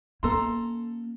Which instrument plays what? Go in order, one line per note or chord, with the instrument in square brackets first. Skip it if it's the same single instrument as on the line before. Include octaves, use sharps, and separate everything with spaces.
[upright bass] A#3 C#4 [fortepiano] A4 A#5 C6